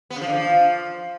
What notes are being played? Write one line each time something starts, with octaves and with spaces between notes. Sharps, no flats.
B3
C#3
F3
D3
F3